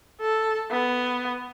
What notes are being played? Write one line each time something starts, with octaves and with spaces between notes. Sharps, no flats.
A4
B3